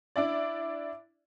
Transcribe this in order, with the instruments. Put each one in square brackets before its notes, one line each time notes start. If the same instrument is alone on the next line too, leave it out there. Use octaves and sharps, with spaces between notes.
[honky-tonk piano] D4 E4 D5